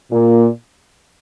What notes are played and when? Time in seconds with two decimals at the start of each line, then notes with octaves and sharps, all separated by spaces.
0.12 A#2